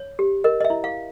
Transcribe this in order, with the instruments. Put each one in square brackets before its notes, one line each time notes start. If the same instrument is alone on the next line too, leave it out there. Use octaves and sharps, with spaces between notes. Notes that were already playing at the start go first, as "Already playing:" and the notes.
Already playing: [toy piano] C#5
G4
A#4 D#5
D#5
E5
E4
F5